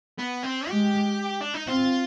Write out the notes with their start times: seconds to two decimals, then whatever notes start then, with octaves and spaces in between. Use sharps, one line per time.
0.19 B3
0.43 C4
0.69 G#3 G4
1.41 D4
1.54 D#4
1.67 C4 F4